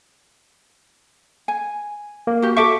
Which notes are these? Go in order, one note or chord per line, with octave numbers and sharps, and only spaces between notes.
G#5
A#3
F#4 G4
F#4 A4 E5 C#6 D6